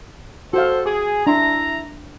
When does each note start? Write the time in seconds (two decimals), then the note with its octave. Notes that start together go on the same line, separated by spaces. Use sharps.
0.53 F#4 A4 C5 F5
0.86 G#4 D6
1.27 D4 E4 E5 A#5 C6